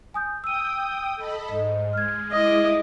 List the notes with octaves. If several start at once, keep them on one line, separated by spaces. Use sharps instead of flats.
G#5 D#6 G6
G5 D#6 E6 D#7
A4 D#5 B5
G#2 D#5
G#3 F6 G#6
G#3 E4 D#5 D6